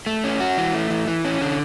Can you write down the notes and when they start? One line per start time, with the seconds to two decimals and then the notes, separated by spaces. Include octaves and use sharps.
0.06 A3
0.24 C#4
0.40 F#4
0.58 E3
0.74 A3
0.90 E3
1.07 E3
1.25 C#4
1.41 D3